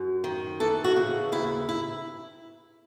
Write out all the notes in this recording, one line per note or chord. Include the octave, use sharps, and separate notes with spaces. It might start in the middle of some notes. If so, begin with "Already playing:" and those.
Already playing: F#2
D#3
E3 A4
F#4
C#3
D#2 E4
E4